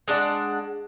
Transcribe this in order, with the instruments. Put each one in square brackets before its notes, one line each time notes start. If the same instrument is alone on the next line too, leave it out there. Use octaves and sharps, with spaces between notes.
[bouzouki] G#3 D4 F#5